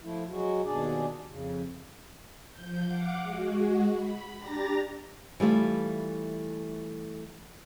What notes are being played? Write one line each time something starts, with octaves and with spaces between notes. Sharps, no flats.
F3 A3 E4
F#3 G#3 F#4
D#2 B2 D4 G#4 D5
F2 C#3
F3 G6
F5 F#5 D6
G#3 F#4
B5
D4 G4 A#5 A6 A#6
E3 G3 A3 F4